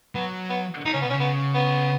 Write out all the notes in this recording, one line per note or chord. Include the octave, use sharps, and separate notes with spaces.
F#3 B3
B3
D#3 D#4
C#3 C#4
B2 B3
C#4
C#3
B3
B3